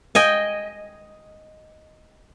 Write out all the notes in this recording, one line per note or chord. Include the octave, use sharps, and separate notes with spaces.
D#5 G5 G#5